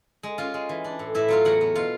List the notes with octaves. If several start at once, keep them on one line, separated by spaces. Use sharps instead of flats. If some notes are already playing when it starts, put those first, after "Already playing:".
G#3
C#4 F4 F5
G#3
E3
D4
A2
A2 E4 E5
F#3 F4 F5
E2 F#4 F#5
B3
B2 F4 F5